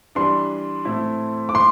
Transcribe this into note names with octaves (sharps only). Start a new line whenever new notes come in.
E3 G3 D4 C6
A2 A3 C4 E4
D6
E3 C6